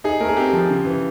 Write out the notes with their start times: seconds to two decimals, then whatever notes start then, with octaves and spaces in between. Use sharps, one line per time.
0.04 D#4 G#4
0.20 A3 A#4
0.28 G#4
0.37 C4 G4
0.53 F3
0.70 C#3
0.85 E3